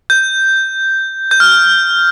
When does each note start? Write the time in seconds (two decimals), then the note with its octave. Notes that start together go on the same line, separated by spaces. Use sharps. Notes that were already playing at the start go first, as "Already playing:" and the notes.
0.10 G6
1.31 G6
1.40 F6